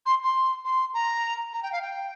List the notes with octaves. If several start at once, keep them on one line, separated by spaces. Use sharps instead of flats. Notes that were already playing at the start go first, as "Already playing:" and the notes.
C6
C6
C6
A#5
A#5
G5
F5
G5